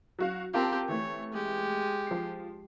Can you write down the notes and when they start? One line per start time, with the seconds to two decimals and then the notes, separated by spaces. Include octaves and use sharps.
0.19 F#3 F#4 F5
0.54 C4 F4 G4 A#4 A5
0.88 E3 A3 C#5
1.33 G#3 G4
2.07 F3 C7